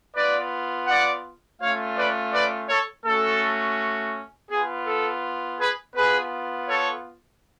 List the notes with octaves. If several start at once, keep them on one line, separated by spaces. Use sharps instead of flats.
B3 F4 B4 D5
D5 F#5
A3 C#4 F4 C#5 F5
B4 D5
B4 D5
A4 C#5
A3 C#4 F#4 A4
B3 F4 G#4
A4
G#4 B4
B3 F4 G#4 B4
A4 C#5